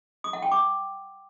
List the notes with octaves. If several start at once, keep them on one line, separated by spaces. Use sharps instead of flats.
D#6
F#5
G5
D6